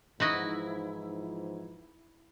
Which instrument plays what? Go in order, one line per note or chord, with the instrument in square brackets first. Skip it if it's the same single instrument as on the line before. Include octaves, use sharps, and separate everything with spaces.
[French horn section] G#2 E3 F3 [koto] D#4 F#4 D#5 [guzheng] E4 B5